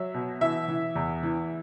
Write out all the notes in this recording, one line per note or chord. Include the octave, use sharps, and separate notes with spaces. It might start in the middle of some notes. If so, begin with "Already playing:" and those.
Already playing: F#3 E5
B2
E3 E5
E3
E2
E3